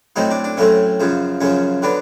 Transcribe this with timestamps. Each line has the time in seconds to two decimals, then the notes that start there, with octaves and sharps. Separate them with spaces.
0.16 A2 F#3 A3 C4 D#4
0.31 D4
0.44 D4
0.57 A2 F#3 A3 C4 C#4
1.00 F#2 C#3 F3
1.41 F#2 C#3 F3 C#4
1.82 D3 F#3 B3 D4